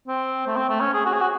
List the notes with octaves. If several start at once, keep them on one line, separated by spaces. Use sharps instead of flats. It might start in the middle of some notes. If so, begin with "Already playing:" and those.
C4
A3
C4
A3
C#4
G#4
F#4
G#4
F#4